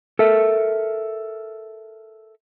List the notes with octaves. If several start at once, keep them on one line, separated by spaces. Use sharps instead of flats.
A4 A#4 E5